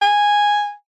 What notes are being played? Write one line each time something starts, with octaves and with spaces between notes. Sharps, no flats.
G#5